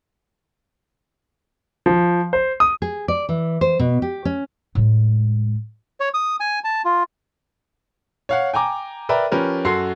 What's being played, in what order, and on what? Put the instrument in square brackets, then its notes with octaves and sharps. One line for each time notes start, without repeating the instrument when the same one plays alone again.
[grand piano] F3
C5
D#6
[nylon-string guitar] G#4
D5
E3
C5
B2
G4
C#4
[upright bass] A2 G#3
[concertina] C#5
D#6
G#5
A5
F4
[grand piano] C#5 F5 F#5
G5 G#5 A#5 D6
A#4 B4 D5 E5 G5 A#5
F3 C#4 G4 A#4 B4
F#2 F#4 A4 C6 C7